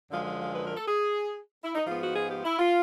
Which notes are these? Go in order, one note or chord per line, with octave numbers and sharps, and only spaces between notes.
F#2 D3 F3 G#3 F5
F5
F5
B4
A#4
A4
G#4
E4
D#4
G#2 F3 G#3 B3 F4
F#4
G#4
G4
E4
F4